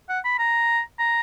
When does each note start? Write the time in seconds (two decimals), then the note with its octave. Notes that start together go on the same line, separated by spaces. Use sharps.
0.09 F#5
0.25 B5
0.39 A#5
0.99 A#5